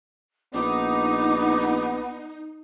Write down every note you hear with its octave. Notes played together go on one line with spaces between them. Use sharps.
A#1 B3 D#4 D6